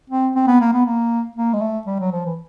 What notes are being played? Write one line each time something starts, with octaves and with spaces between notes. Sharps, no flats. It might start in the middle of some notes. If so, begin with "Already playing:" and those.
C4
C4
B3
A#3
B3
A#3
A#3
G#3
A3
G3
F#3
F3
E3